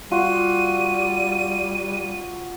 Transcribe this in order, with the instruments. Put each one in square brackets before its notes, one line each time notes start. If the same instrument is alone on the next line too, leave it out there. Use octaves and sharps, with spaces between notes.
[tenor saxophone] G3 [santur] F4 F#4 [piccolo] D#7